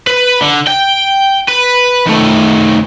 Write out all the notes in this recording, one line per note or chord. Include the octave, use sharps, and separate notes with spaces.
B4
D3
G5
B4
D#3 A3